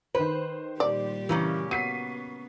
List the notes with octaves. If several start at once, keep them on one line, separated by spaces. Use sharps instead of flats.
D#3 B4 C5
A#2 G3 G4 D5
C#3 E3 A#3 C#4
F#3 B3 B6 C7 D#7